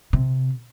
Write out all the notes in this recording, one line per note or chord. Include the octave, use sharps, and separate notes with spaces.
C3